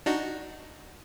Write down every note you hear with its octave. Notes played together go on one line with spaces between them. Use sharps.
D4 D#4 F#4